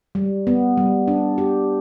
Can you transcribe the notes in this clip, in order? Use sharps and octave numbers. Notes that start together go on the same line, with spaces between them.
G3
B3
G3
D4
G4